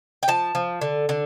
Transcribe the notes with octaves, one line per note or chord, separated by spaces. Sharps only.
G5
F3 A5
F3
D3
D3